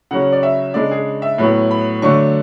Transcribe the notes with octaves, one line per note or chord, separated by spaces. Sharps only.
C#3 F#3 C#4 F#5
D5
E5
C#3 G#3 D4 D5
G#4
E5
A2 F#3 B3 B5
B5
D3 F#3 A3 D4 C#6